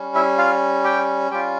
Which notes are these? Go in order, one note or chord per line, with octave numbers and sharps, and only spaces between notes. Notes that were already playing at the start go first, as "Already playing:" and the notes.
Already playing: G3 C#4
E4 E5
F4 F5
G4 G5
G3 C#4 F4 G4 G5